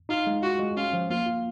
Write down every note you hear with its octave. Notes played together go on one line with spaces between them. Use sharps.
D#4 F4
G#3
F4 F#4
G#3
C#4 F4
F3
A#3 F4
F4